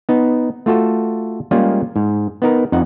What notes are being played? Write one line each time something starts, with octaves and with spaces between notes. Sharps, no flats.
B3 D#4
A3 F4 F#4 A4
G3 G#3 A#3 C#4 F4 G#4
G#2
B3 D#4 A#4
F2 D#4 F#5